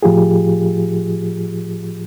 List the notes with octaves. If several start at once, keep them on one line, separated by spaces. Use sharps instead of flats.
A2 F3 F4 G4 G#4